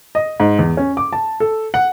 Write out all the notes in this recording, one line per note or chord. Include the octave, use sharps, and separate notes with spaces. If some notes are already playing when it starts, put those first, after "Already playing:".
D#5
G#2
E2
C#4
D6
A5
A4
F#5